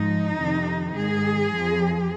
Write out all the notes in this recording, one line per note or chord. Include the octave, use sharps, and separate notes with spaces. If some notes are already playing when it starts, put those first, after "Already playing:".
Already playing: G#2 F3 D#4
F2 C3 D#3
G#2 D#3 G#4
F2 F3